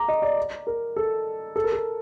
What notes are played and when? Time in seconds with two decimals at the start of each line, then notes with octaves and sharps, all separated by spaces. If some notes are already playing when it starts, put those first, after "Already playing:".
Already playing: A#5 D6
0.09 D#5
0.22 D5
0.67 A#4
0.96 A4
1.56 A4
1.64 A#4
1.72 A4